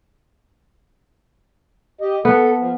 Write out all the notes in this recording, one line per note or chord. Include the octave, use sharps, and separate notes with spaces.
G4 D#5
B3 A4
F3